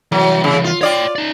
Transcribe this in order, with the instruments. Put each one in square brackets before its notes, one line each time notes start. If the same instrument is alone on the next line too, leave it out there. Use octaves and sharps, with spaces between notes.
[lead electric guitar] C2 E3 [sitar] F#3
[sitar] C#3
F4
[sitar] F4 D5 [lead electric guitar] C#5 G5
[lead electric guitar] D#4 D5